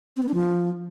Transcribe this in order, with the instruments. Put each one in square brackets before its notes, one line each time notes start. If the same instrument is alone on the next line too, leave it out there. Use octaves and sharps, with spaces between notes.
[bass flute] C4
B3
D4
F3